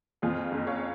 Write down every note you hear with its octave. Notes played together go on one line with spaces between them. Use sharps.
F2 F4 G#4
F#1
C#5 F5